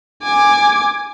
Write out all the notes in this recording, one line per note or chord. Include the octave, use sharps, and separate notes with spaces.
G#5 D6